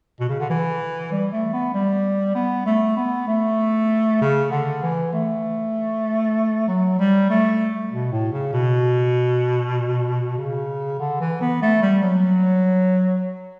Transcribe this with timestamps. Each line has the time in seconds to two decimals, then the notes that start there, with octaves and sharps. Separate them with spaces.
0.20 B2
0.29 C#3
0.40 D3
0.50 E3
1.12 G3
1.32 A3
1.53 B3
1.74 G3
2.35 B3
2.66 A3
2.97 B3
3.27 A3
4.21 C#3
4.51 D3
4.83 E3
5.13 A3
6.68 F#3
6.99 G3
7.30 A3
7.91 B2
8.12 A2
8.32 C#3
8.53 B2
10.38 C#3
11.00 D3
11.20 E3
11.41 B3
11.62 A3
11.82 G3
12.02 F#3